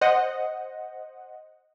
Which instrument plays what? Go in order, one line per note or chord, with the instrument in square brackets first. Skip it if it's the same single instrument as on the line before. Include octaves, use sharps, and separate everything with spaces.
[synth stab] C5 D#5 F#5